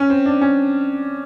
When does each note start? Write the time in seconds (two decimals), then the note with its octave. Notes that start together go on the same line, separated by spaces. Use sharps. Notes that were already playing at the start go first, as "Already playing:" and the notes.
Already playing: C#4
0.10 C4
0.26 D4
0.41 C#4